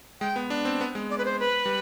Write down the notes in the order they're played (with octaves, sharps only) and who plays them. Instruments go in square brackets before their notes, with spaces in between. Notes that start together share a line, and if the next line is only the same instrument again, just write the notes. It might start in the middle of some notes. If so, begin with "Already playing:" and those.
[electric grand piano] G#3 [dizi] G5
[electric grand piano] B3
D4
C4
B3
G#3
[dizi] D5
B4
C5
B4
[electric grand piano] G3